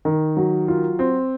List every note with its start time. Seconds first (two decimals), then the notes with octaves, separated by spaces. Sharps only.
0.05 D#3
0.37 F#3
0.68 F4
0.99 C4